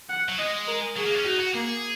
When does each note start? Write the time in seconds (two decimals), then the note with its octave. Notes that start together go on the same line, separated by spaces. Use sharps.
0.09 F#5
0.29 F#3
0.39 G#3 D#5
0.67 A#4
0.97 F#3 G#4
1.06 A#3
1.15 C#4
1.25 D#4 F#4
1.40 F#4
1.54 A#3 G#4